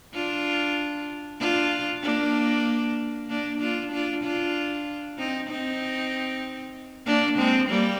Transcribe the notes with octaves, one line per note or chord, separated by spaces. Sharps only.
D4 F4
D4 F4
A#3 D4
A#3 D4
D4 F4
D4 F4
D4 F4
C4 D#4
C4 D#4
A#3 D4
G#3 C4
G3 A#3